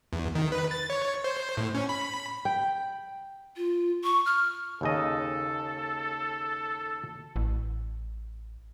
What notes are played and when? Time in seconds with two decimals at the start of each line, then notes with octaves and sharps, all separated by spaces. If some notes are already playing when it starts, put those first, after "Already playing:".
0.13 E2
0.35 D#3
0.52 B4
0.71 A6
0.90 C#5
1.24 C5
1.57 A2
1.74 C#4
1.89 B5
2.45 G5
3.57 F4
4.04 C#6
4.26 F6
4.81 D#2 C#3 A4 D#5
7.36 A1